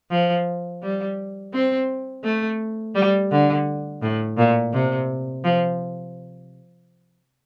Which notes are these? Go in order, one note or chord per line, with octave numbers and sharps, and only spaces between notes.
F3
G3
C4
A3
G3
D3
A2
A#2
C3
F3